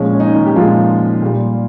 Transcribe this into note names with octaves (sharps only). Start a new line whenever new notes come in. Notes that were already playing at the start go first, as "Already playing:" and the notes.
Already playing: A#2 F3 G#3 C#4
C#4
D#4
C#4
D#3 D#4
G4
A#2 F3 G#3 F4
A#2 G3